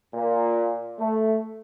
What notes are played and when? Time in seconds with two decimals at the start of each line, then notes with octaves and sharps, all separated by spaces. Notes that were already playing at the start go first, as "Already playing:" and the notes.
0.14 A#2
0.99 A3